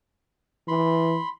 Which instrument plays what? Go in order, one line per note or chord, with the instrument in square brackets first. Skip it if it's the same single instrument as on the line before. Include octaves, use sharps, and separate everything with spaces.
[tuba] E3 [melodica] B5 C6